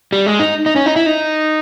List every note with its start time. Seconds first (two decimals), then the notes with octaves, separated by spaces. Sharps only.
0.12 G3
0.26 G#3
0.40 D#4
0.66 D#4
0.76 C#4
0.86 D#4
0.96 E4
1.06 D#4